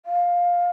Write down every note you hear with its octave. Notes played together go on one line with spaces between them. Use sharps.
F5